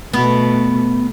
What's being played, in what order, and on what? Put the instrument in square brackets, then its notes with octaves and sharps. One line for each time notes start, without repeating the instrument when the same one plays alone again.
[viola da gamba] B2 A3 [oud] B3